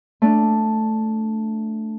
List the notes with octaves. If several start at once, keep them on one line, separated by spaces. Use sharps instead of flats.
A3 D4